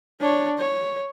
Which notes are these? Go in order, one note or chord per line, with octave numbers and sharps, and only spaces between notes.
D4 C#5
C#5